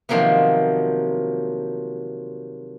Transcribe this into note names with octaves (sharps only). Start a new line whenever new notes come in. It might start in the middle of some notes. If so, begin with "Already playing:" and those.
C3 D#3 F3 F#3 A#3 B3